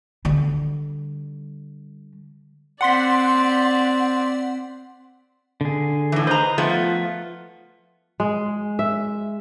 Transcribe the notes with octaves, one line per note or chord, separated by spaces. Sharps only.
D3 G3
C4 D5 F#5 C6 B6
D3 G#4
A2 E3
B4 C5 D#5 A#5
F3 A3 B3 F4
G#3
E5